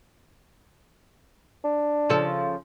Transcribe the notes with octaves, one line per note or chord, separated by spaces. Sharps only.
D4
C#3 F3 A4